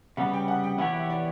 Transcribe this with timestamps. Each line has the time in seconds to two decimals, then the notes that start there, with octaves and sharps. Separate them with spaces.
0.17 C#3 G3 B3 F#5
0.34 G5
0.48 F#5
0.64 G5
0.78 E3 B3 E4 G4 C#5 F#5
0.94 E5
1.10 D5